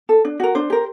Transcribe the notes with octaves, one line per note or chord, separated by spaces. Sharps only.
A4
D4
F#4 A#4
D4 C5
G4 A#4